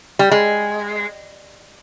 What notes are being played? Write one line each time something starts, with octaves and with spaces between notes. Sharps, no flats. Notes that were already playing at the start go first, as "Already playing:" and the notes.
G3
G#3